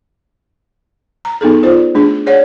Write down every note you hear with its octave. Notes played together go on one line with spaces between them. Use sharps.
A#5
B3 D#4 G#4 A4
F4 C5 D5
A3 D4 G#4
G#4 C#5 D5 F#5